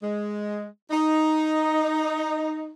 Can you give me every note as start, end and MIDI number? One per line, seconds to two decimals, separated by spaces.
0.02 0.64 56
0.91 2.73 63